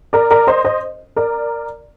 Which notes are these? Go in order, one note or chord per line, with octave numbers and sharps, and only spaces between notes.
A#4 D5
A#4 D5
C5 D#5
C5 D#5
A#4 D5